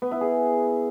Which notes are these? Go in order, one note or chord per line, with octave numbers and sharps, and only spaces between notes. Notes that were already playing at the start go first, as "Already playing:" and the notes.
B3
E4
G#4